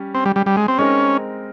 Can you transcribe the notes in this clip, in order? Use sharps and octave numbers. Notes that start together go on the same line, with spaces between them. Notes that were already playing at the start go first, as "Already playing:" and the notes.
Already playing: G3 C#4
C4
G3
G3
G3
G#3
C4
G#3 C4 C#4 D#4 A#4